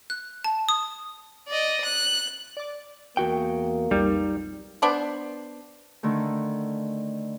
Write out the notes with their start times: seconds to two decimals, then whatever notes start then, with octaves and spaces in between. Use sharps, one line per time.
0.10 F#6
0.44 A5
0.69 D#6
1.48 D5 D#5
1.84 F#6
2.57 D5 D6
3.17 E2 A#3 F#4 G5
3.91 B1 F2 G3 D#4
4.82 B3 D4 C5
6.03 D3 D#3 A3